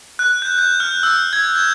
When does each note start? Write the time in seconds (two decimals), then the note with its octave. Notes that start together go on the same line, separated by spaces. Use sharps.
0.19 F#6
0.42 G6
0.58 G6
0.80 F6
1.03 E6
1.33 G#6
1.55 G6